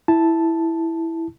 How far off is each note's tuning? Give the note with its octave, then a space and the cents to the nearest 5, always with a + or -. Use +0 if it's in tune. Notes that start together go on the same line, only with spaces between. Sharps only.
E4 -5 A5 +0